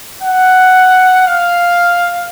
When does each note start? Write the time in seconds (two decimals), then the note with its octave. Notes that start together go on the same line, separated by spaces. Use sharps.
0.23 F#5
1.26 F5